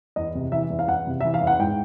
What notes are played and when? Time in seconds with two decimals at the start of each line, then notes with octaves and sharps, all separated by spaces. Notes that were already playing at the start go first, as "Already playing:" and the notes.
0.16 E2 D#5
0.35 C3
0.52 E3 E5
0.70 E2
0.79 F5
0.88 E2 F#5
1.07 C3
1.21 E3 E5
1.34 F5
1.41 E2
1.47 F#5
1.59 G#2 G5